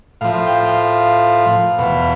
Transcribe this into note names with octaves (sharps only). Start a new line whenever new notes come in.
A2 F3 F5
F5
G5
F5
E2 B2